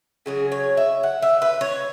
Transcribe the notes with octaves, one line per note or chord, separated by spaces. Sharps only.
C#3 F#3 G#4
C#5
E5
F#5
E5
B4
C#5